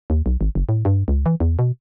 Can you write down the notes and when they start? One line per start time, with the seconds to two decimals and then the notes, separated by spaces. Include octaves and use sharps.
0.10 D#2
0.26 B1
0.41 G#1
0.55 F#1
0.69 A2
0.85 G2
1.08 C#2
1.26 E3
1.40 E2
1.59 B2